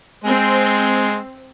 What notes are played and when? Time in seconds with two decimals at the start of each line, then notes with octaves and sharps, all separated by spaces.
0.24 G#3 C4